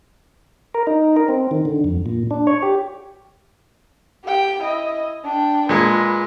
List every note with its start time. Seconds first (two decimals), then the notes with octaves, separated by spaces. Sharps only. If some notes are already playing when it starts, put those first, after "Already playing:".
0.74 A#4
0.87 D#4
1.16 A#4
1.28 C4
1.51 D#3
1.65 D3
1.84 F2
2.06 A#2
2.31 D4
2.47 C#5
2.63 G4
4.25 G4 G5
4.62 E4 D#5
5.24 D4 G5
5.69 A#2 G#3 B4